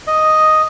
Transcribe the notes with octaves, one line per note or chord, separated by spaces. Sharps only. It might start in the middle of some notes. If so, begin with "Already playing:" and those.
D#5